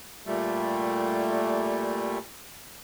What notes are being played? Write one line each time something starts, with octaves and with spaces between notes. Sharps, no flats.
A#2 G3 A3